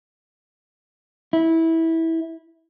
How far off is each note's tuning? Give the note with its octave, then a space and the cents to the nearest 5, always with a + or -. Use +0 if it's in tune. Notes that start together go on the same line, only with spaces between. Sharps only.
E4 -15